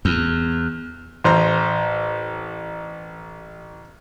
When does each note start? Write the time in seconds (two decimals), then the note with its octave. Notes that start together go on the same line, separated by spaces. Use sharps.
0.05 E2
1.24 A1 C5 A#5